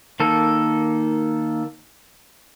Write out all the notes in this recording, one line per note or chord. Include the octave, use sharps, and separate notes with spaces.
D#3 A#3 A4